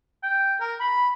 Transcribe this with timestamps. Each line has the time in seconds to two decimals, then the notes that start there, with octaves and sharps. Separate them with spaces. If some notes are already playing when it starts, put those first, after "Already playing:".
0.23 G5
0.61 A#4
0.81 B5